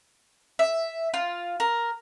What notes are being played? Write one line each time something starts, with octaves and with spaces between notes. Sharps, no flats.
E5
F4
A#4